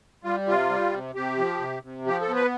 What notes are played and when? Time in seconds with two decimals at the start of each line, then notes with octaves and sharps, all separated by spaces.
0.24 G3 F4
0.46 C3 F4
0.70 G3
0.93 C3
1.15 C3 G4
1.38 F3
1.60 C3
1.83 C3
2.06 F3 G4
2.21 A4
2.29 B3
2.36 B4